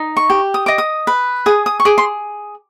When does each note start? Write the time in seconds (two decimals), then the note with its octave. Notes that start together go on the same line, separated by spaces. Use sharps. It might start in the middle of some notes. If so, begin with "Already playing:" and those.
Already playing: D#4 D#5
0.17 C#6
0.30 G4
0.54 D#6
0.66 D#5 D6
0.78 D#6
1.07 B4
1.46 G#4 D#6
1.66 D#6
1.80 C#6
1.85 G#4 D6
1.98 C6